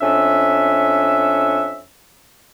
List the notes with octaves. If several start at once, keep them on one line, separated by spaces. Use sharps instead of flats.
F2 C#4 D4 E5